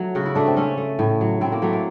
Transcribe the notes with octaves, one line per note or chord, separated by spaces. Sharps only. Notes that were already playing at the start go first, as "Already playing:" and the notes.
Already playing: F#3 A3
C#3 F#4
E4
A3 D4
C4
A3 C#4
A3
A2
F#3
A2 C4
A#3
F#3 A3
A#3